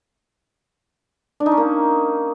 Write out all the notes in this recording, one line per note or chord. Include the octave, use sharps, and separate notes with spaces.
D4
D#4
C#4
A#3